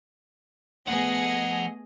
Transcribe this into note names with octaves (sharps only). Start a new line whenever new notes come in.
F3 A3 B3 G#4 D#5 F#5